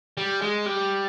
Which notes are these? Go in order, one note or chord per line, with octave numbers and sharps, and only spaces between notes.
G3
G#3
G3